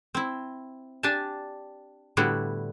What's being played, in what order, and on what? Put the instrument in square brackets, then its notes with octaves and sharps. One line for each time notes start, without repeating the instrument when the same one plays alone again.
[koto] C4 E4
D4 G4 G#5 A5
A2 D3 G3 B3 E4 F#4